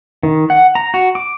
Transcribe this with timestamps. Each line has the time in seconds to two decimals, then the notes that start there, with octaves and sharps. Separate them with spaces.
0.23 D#3
0.50 F#5
0.75 A#5
0.94 F#4
1.15 D6